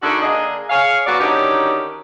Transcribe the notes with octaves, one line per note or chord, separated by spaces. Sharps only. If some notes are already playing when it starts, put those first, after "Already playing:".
D3 D#3 A3 D4 F#4 G#4
D3 A#3 D4 G#4 D#5
G#4 C#5 F5
F#3 A#3 B3 F#4 D5
D3 D#3 C#4 D#4 F#4 G4